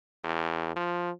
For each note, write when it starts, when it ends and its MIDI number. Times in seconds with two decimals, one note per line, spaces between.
0.24 0.73 40
0.76 1.11 53